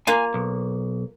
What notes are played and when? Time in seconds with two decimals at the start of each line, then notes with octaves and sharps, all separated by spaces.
0.07 A#3 F4 G#5
0.34 B1